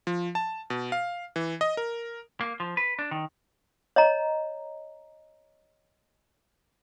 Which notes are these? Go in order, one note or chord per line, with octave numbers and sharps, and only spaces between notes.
F3
A5
B2
F5
E3
D#5
A#4
A#3
F3
B4
D4
D#3
C#5 D#5 A#5